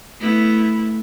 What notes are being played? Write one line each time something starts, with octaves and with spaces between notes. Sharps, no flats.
A3 B3 E4